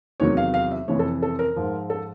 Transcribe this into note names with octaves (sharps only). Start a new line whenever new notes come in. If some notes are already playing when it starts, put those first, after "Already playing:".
E2 C3 D#3 F#3 C#5
F5
F5
E5
F2 C3 E3 C#5
A4
A4
A#4
G#2 F3
A4